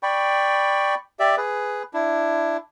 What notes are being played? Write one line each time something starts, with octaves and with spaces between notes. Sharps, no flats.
D5 G5 B5 C#6
G4 D5 E5
G#4 B4
D4 E4